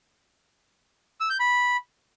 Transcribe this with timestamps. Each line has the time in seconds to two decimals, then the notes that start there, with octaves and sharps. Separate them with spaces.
1.20 E6
1.30 G6
1.40 B5